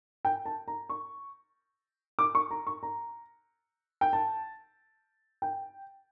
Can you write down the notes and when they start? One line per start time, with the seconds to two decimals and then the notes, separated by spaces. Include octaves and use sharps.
0.25 G5
0.46 A5
0.68 A#5
0.90 C#6
2.19 D6
2.35 C#6
2.51 A#5
2.67 C#6
2.83 A#5
4.01 G5
4.13 A5
5.42 G5